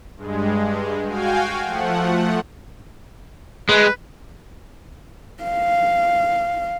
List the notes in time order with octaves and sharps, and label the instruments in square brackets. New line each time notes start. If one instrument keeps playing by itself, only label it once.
[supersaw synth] G2 G#3
F#4 F5 G5 G#5
F3 A3 F#5
[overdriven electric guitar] G#3 [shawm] B4
[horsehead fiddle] F5